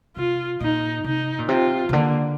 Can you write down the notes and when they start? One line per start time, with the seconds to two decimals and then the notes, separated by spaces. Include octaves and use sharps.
0.16 C3 F4
0.60 A#2 D#4
1.04 C3 D#4
1.38 A#2
1.48 C3 F4
1.89 C3
1.92 D3 A#3